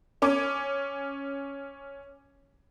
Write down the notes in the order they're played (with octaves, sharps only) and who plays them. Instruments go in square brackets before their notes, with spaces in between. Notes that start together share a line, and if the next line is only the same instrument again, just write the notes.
[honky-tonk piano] C#4 D6